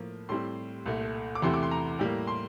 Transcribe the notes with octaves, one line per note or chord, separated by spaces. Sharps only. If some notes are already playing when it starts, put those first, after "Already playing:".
Already playing: A2 F3 A#3
A2 G3 C4 C6
C2 A#2 A3
D6
E2 C3 E3 A3 C4 C6
D6
C6
A#5
A2 G3 A#3
C6